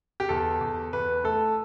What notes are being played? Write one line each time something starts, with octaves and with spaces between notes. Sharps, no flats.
G4
E2 A4
E2
E2 B4
A3 A4